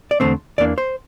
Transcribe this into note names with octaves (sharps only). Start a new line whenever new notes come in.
D5
E2 D3 A3 C4 C5
E2 E3 A#3 D4 D5
C5